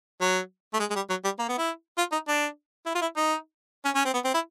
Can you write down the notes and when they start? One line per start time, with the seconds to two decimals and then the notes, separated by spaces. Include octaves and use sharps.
0.21 F#3
0.73 A3
0.79 G#3
0.90 G#3
0.95 G3
1.10 F#3
1.24 G3
1.39 A#3
1.48 B3
1.58 E4
1.98 F4
2.12 D#4
2.28 D4
2.86 E4
2.95 F4
3.01 E4
3.16 D#4
3.85 C#4
3.95 C#4
4.05 C4
4.14 B3
4.24 C4
4.34 E4